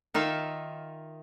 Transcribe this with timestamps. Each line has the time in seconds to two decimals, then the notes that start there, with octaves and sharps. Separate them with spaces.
0.14 D#3 D#4 F4 E5 F5